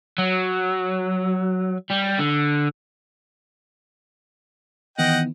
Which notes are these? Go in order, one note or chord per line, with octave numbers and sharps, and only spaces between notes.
F#3
G3
D3
D#3 E3 B3 D#5 F#5 G5